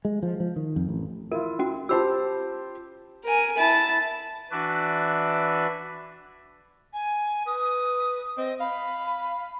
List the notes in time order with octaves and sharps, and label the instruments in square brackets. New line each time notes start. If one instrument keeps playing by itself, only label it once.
[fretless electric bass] G#3
F3
F3
D#3
F2
A1
[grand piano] E4 F4 [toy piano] A#4
[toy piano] C#4 F#4
[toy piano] F4 B5 E6 [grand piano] G4 C5 A5
[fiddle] A#4 G#5
E4 A5
[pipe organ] E3 D4 F#4 B4 D5 E5
[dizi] G#5
[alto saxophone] B4 [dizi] D#6
[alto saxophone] C4 [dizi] D#5
[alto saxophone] F5 [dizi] B5